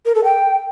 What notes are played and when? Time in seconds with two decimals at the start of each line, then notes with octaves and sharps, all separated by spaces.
0.05 A#4
0.15 A4
0.24 G5